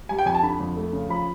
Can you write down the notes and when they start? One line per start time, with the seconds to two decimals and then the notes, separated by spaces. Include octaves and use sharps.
0.09 G3 G#5
0.19 G5
0.26 F2 G#5
0.34 A5
0.43 D3 B5
0.60 F2
0.77 A3
0.93 C#3
1.09 F3 B5